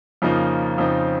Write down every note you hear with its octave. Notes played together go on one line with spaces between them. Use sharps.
F2 C#3 F3 A#3 D#4
F2 C#3 F3 C4 D#4